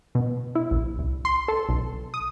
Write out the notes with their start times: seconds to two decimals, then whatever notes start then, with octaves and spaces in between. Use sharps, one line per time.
0.15 B2
0.55 E4
0.71 A#1
0.99 C2
1.25 C6
1.48 A4
1.69 B1
2.14 D#6